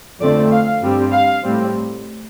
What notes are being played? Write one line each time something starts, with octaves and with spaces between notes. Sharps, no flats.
F2 D3 A3 C4 D5
F5
G2 G3 C4
F5
A2 G3 C4